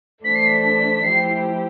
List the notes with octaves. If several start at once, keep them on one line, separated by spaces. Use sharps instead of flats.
E3 A3 D4 A4 C5 B6
C7
B6
F3 A3 E4 G4 C5 C7